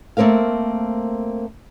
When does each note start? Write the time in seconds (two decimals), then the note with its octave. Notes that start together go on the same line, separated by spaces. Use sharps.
0.17 A3 A#3 C4 A#4 F5